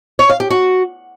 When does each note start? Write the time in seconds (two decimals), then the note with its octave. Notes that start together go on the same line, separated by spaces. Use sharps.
0.19 C#5
0.29 F5
0.40 G4
0.50 F#4